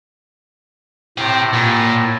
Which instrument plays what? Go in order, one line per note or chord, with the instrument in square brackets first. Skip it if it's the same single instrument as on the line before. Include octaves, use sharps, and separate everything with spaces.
[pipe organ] A2 [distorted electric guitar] G4 C5
[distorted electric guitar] A#2